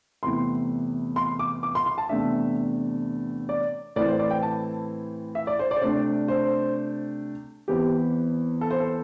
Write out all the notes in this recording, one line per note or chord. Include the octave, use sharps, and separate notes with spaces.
E2 C3 A3 E4 C6
C6
D6
D6
C6
C6
A5
E2 C3 A3 D4 E5
D5
A2 E3 C4 E4 D5
C5
D5
G5
A5
E5
D5
C5
D5
C5
C3 A3 D4 D5
C5
E2 E3 C4 G4
A4
C5
A4